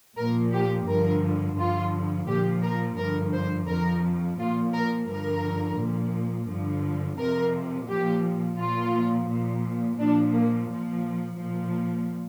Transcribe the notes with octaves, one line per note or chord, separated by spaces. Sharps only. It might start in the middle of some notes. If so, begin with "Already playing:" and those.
A#2 F3 A#4
G4
G2 D3 F3 A#4
G2 D3 F3 F4
A#2 F3 G4
A#4
G2 D3 F3 A#4
C5
F2 F3 A#4
A#2 F3 F4
A#4
G2 D3 F3 A#4
A#2 F3
G2 D3 F3
F2 C3 F3 A#4
A#2 F3 G4
A#2 F3 F4
A#2 F3
A#2 F3 D4
A#3
A#2 F3
A#2 F3